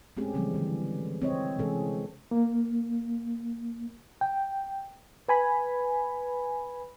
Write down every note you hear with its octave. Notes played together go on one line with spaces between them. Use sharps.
G#3 A3 C4 C#4 G4 G#4
C#3 E3 F3 G3 G#3 C4
D3 E3 G3
C4 C#5 D#5
C3 E3 G#3 C#4 G#4 A4
A#3
G5
B4 G#5 B5